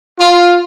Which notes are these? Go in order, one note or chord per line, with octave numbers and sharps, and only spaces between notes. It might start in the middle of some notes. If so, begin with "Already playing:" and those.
F4